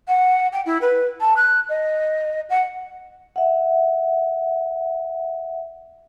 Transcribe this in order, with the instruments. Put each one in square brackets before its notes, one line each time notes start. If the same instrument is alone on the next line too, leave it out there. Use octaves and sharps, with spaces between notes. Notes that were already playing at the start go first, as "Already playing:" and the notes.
[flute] F#5
G5
E4
B4
A5
F#6
D#5
F#5
[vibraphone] E5 F#5